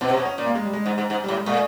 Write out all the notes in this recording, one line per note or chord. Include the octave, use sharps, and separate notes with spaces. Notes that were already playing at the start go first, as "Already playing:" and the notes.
B2 C4
C3
C#4
B2
C#4
A#2
A#3
G#3
G3
G#3
G#2
G#2
G#2
A2 G3
G#3
A#2 A3